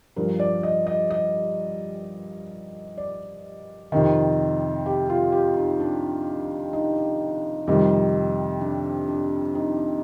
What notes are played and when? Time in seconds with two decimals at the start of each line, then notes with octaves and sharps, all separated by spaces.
0.16 G2 F3 A#4
0.40 D5
0.63 D#5
0.87 D#5
1.11 D#5
2.98 D5
3.92 F2 C3 D#3
4.86 G4
5.10 F4
5.32 G4
5.56 D#4
5.80 D4
6.73 D#4
7.67 F2 C3 D#3 G3
8.61 D4
9.08 D4
9.55 D#4